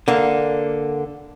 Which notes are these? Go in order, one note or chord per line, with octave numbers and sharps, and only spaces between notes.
D3 A#3